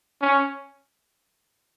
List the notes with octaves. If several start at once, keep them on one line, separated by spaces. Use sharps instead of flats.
C#4